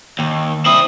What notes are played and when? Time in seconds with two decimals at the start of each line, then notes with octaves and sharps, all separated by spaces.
0.19 D#2
0.66 C4 E4 D#6